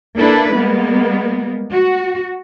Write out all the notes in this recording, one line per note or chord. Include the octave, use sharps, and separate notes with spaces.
A#3 D4 E4 A4 B4
G3 G#3 A#3 B3
F#4